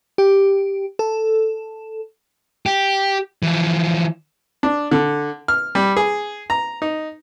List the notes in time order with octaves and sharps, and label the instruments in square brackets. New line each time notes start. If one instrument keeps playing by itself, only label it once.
[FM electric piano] G4
A4
[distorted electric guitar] G4
E3 F3
[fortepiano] D4
D3
F6
G3
G#4
A#5
D#4